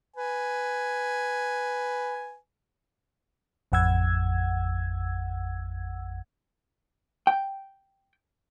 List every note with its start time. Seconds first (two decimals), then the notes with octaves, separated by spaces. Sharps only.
0.16 B4 G#5
3.72 A1 F2 F#5 E6 G#6
7.27 G5